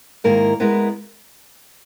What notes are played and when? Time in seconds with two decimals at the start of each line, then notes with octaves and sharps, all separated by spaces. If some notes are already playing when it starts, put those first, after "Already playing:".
0.24 G#2 D#3 A#3 E4 A#4
0.60 G#3 B3 E4 A#4